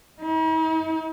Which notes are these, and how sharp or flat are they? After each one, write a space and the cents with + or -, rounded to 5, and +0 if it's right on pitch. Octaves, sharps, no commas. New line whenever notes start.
D#4 +45